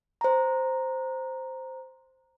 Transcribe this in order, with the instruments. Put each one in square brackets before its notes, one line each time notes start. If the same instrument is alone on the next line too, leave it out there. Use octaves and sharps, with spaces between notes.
[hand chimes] C5 A#5